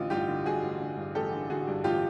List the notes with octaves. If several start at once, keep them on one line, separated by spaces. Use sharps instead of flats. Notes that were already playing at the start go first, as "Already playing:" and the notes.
Already playing: A1 D3 F4
G2 F4 G4
D3
G2 F#4 G#4
A1
D3
G2
A1 G4 A4
D3
D3 F#4 G#4
G2
A1 F4 G4